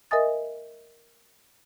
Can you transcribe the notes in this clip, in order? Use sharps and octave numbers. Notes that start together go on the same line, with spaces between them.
A#4 D#5 E5 G#5 D#6 A6